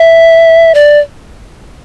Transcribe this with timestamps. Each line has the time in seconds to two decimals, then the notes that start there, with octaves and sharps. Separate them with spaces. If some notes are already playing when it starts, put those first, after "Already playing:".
Already playing: E5
0.75 D5